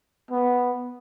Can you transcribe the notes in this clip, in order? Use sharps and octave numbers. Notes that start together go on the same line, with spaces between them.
B3